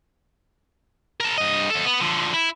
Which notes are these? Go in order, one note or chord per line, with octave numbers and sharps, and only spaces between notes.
A#4 A5
G2 D#5
D#2 A4
B3
D3 F3
E4